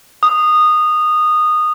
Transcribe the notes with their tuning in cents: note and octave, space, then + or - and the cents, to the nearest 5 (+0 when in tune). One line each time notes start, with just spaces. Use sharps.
D#6 -15